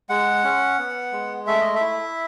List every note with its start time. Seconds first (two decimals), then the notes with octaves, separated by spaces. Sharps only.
0.10 G#3 F#5
0.44 C#4
0.78 B3
1.13 G#3
1.47 A3 E5
1.61 D#5
1.75 E5
1.81 E4